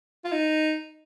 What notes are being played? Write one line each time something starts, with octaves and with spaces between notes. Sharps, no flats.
F4
D#4